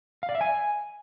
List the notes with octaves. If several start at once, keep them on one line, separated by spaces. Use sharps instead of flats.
F5
D5
E5
G#5